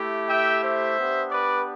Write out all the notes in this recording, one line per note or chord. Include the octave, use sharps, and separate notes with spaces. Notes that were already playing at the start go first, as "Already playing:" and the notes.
Already playing: A3 E4 G4
E5 G5
C5 E5
B3 D4 G4
B4 D5